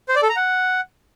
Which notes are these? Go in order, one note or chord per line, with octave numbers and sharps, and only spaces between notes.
C5
D5
A4
A#5
F#5